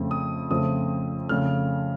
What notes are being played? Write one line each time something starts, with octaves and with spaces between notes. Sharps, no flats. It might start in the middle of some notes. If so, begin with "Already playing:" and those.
Already playing: F2 C#3 A3 C4
D#6
F2 C#3 A3 C4 D#6
F2 C#3 A3 F6